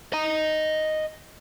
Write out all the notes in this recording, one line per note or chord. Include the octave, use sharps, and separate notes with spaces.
D#5 A#5